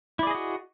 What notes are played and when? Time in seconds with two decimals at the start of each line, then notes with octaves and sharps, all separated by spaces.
0.19 E4
0.23 D5
0.27 G#4
0.31 D#5
0.35 F#4